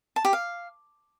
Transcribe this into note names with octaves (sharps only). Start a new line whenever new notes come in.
A5
G4
F5